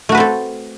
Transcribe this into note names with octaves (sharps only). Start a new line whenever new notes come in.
A3 C4 F#4 A4 B4